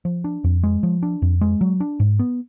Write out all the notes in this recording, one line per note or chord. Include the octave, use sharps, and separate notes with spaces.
F3
D4
F2
G#3
F3
D4
F2
G#3
F#3
D4
G#2
B3